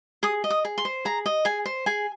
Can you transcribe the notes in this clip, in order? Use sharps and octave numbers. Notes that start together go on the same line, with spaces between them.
G#4 D#6
D#5
D#6
G#4
C6
C5
G#4 A#5
D#5
G#4 G#5
C5
G#4 G#5